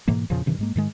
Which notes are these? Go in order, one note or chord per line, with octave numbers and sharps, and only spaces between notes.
G#2 B2 E3 A#3
E2 A#2 C#3 F3
G2 C3 D#3 E3
G#2 G#3 A#3
G#2 D#3 G#3